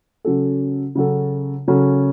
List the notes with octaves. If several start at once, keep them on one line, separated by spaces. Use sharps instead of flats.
C#3 F#3 C#4 F#4 A4
C#3 F#3 C#4 F#4 A4
C#3 F#3 C#4 F#4 A4